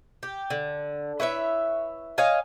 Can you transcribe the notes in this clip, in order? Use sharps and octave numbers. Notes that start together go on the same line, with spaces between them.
G4
D3
E4 B4 C#5 E5
C#5 D#5 F5 G#5